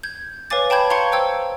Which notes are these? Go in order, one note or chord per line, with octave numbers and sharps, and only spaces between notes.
G6 G#6
B4 C#5 F5 G#5 D6 A6
G5 A5 B5 G6 G#6
F5 A#5 C6 C#6 G#6 C#7
C5 G5 E6 G#6